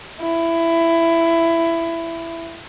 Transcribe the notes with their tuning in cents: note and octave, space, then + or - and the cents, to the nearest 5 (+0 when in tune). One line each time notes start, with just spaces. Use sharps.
E4 +15